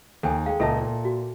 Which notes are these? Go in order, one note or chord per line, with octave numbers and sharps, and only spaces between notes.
D#2 A4 G5 G#5
G#3 F5 G5
C#2 A#2 A4 D#5 E5 A5
A#2
F#4